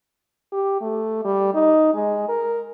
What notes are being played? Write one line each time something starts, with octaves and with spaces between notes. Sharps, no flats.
G4
A3
G3
D#4
G#3
A#4